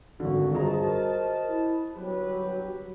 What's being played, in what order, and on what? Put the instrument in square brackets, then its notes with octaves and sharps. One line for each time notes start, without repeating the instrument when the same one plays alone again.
[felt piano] G#1 D3 [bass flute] F#4
[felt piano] G2 G#4 A#5 [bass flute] F4 [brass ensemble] C5 D#5 A5
[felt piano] F#4 [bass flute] A#4
[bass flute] E4
[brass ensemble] G1 G4 B4 [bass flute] F#3